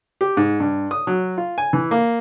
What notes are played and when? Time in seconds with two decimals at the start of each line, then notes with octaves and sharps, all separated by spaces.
0.21 G4
0.37 G#2
0.60 G2
0.91 D#6
1.07 F#3
1.38 F4
1.58 G#5
1.73 E3
1.91 A#3